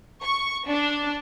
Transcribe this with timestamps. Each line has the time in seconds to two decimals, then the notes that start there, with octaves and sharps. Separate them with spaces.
0.23 C#6
0.68 D4